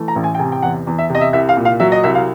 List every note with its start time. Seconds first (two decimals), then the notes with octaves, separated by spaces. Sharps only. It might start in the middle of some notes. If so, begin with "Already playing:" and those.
Already playing: E3 A3
0.08 A#5
0.16 A1
0.24 G#5
0.35 G5
0.39 C3 G#5
0.52 G5
0.63 E2 F#5
0.87 E2
0.99 E5
1.10 C3
1.15 D#5
1.21 E5
1.33 C2 E5
1.49 F5
1.57 A#2
1.65 F5
1.80 F#3 E5
1.92 D#5
2.03 C2 E5
2.15 F5